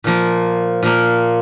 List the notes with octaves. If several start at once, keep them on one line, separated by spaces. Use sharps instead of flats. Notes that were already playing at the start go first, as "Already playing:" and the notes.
A#2 F3 A#3
A#2 F3 A#3